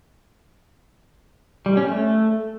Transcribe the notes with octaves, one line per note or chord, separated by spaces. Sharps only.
G3
C#4
A3